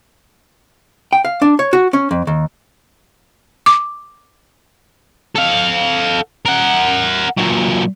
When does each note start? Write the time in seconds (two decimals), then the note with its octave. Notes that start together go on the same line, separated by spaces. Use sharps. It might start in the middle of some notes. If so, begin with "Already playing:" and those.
1.13 G5
1.25 F5
1.42 D4
1.59 C#5
1.73 F#4
1.93 C#4
2.11 F2
2.27 D#2
3.66 D6
5.35 A4 F5
6.45 A#4 F#5
7.37 A#2 F#3